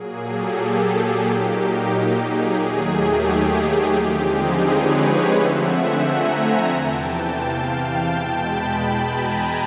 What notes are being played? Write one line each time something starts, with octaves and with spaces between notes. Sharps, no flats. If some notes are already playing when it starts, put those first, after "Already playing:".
Already playing: A#2 F#3 A#3 G#4
G4 A4
G#4
A#2 F#3 A#3 D#4 G4
G#4
D#2 D#3 F#3 A3
G4
G4
D3 F3 G#3 C4 D#4
G#4
B4 C#5
D3 F3 A3 C4 E5 F#5
F#5 G#5
G#5 A#5
E2 C3 E3 G5 A5
F5 G5
E2 B2 G#3 G5 A5
A5 B5
A5 B5
G#5 A#5